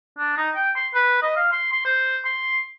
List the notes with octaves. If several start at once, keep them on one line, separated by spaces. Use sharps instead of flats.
D4
D#4
G5
C6
B4
D#5
F5
C6
C6
C5
C6